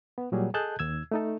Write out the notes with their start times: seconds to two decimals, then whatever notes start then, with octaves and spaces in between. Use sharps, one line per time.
0.18 B3
0.32 A#2 F#3 G3 G#4
0.54 G#4 A4 D#5 A5 F#6 G6
0.79 D#2 E6 G#6
1.11 A3 D#4 A4